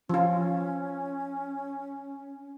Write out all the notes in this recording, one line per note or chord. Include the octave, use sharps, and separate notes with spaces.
F3 C#4 F4